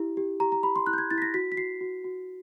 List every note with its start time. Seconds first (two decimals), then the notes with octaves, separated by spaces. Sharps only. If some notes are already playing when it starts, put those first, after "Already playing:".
Already playing: E4 G4
0.17 G4
0.40 G4 A#5
0.52 A#5
0.63 G4 B5
0.76 C6
0.86 E4 F#6
0.93 G6
0.98 G#6
1.11 E4 A6
1.18 B6
1.22 A#6
1.34 F#4 B6
1.52 B6
1.57 F#4 C7
1.81 F#4
2.04 F#4